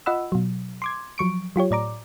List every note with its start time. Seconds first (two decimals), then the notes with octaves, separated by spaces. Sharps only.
0.06 F4 D#5 F#5 B5 E6
0.32 B2 F#3
0.82 C6 D6 G#6
1.18 F3 F#3 C#6 D7
1.56 F#3 F4 G4 C#5
1.71 A2 D5 A#5 D6